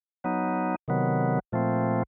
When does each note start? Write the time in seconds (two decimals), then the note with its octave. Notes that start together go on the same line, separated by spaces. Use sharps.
0.24 F#3 B3 D#4
0.88 C3 D#3 F#3 B3
1.52 A#2 F3 A3 C4